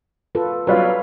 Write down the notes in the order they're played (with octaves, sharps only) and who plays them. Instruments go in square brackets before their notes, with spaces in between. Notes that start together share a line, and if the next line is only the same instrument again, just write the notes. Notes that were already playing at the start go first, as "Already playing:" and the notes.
[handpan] F4 A4 B4
[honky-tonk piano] F#3 G3 F4 [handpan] B4 C#5 F5